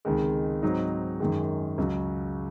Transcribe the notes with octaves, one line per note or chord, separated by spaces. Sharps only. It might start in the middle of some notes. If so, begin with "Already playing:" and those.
C#2 C3 D#3 G#3
G#2 F#3 C4 D#4
F#2 D#3 G#3
C#2 C#3 F#3